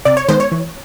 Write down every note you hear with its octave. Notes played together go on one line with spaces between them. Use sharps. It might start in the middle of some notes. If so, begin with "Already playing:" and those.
C3 D5
C#5
D#3 G#3 B3 C5
C#5
E3